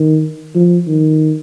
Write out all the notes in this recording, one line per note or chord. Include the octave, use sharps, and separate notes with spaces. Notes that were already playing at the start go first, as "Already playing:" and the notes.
Already playing: D#3
F3
D#3